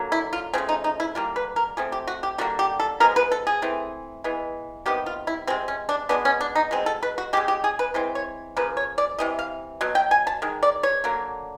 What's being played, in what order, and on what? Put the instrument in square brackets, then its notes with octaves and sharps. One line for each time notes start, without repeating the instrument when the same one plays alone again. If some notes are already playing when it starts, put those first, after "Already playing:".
Already playing: [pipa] D3 F#3 A#3
E4
F4
C#3 F3 A3 C4
D#4
D#4
E4
D3 G3 A#3 F4
B4
A#4
F3 A3 C4 G#4
G4
F#4
G4
D3 G3 A#3 F#4
G4
A4
F3 G#3 B3 A#4
B4
A4
G#4
E3 A3 C4
E3 G#3 B3
C3 D#3 G3 B3 G4
F4
E4
C3 F3 G#3 C4
C#4
D4
B2 G#3 B3 D4
C#4
D4
D#4
B2 G#3 C4
A4
B4
F#4
C#3 F3 G#3 G4
G4
G#4
B4
E3 G#3 C4 C5
C#5
C#3 F3 A#3 B4
C#5
D5
C3 E3 D#5
F5
B2 F#3
G5
G#5
A5
D#3 G#3
D5
C#5
D3 F#3 A#3